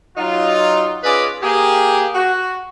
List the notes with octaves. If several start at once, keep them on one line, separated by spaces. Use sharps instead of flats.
F#3 D#4 F4
C#4 F4 G#4 B4 D5 D#5
A#3 G4 G#4
F#4